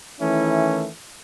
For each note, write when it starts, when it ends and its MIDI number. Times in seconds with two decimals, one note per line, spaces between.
0.21 0.89 51
0.21 0.89 52
0.21 0.89 57
0.21 0.89 61
0.21 0.89 64